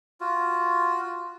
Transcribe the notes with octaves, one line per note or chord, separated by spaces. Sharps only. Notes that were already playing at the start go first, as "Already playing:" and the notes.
F4 F#4